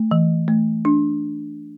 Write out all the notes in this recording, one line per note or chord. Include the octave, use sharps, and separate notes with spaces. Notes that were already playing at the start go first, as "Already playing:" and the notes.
Already playing: A3
E3
A3
D4